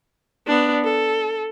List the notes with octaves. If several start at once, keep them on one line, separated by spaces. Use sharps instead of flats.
B3 D4
A4